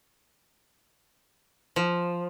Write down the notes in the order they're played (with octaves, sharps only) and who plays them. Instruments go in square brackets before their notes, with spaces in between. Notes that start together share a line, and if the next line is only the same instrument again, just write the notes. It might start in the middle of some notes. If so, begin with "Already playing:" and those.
[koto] F3